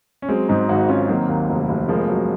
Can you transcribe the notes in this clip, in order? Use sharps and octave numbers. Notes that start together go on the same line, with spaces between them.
C#4
F#3 G#3 C4
G#2 C4 D#4
G#1 D#4 F#4
C4 C#4 F4
D#3 F#3 A#3
D#2
F1
F1
F3 G#3 A#3
F#3